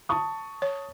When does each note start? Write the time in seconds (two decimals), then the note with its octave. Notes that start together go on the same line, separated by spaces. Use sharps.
0.09 A5 C#6 D#6
0.62 C#5